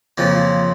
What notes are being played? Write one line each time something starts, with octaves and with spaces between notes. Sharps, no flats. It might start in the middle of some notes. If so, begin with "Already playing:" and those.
F2 C#3 F3 A#3